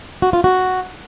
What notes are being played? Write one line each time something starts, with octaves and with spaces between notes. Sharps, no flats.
F#4
F4
F#4